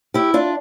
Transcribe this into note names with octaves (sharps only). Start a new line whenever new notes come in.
E4 G4
D4 F4